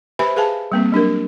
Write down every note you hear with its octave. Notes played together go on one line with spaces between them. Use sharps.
G4 B4 C5 E5 G#5 B5
G#4 B4 F5 G#5 A5
G3 A#3 C4
F#3 D4 G4 A#4